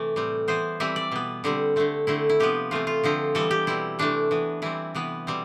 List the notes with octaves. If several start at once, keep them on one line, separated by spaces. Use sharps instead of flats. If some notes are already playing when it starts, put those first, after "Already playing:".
Already playing: C3 E3 A3 D5
A2 G3 C4
E3 B3 C5
E3 G3 C4 E5
D5
B2 B3
D3 G3 C4
D3 A3 C4
D3 A3 C4 E4
E4
C3 F3 B3 G4
E3 A3 C4 F4
F4
D3 F3 C4
E3 G3 B3 A4
G4
B2 G3 C4 E4
C3 E3 A3 D4
E3 B3
E3 G3 C4 E4
C3 E3 B3
B2 G3 C4